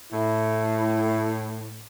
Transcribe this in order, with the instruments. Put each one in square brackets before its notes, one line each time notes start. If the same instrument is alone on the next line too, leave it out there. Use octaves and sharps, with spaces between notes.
[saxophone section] A2 [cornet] E4